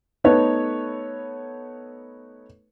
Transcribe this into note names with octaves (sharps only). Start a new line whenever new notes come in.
A3 B3 D#4 A4 B4 C#5